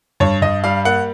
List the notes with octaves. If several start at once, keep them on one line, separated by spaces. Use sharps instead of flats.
G2 C#5
G2 D#5
G3 F5
A#3 F#5